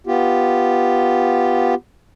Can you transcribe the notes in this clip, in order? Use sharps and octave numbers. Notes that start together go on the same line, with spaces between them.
B3 F4 G4